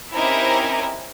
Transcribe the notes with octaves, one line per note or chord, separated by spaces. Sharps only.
C4 C#4 D#4 E4 G4 A#4